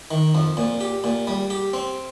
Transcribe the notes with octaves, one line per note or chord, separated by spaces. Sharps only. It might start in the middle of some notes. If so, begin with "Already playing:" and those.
D#3
F2
A#2
G4
A#2
G3
G4
C4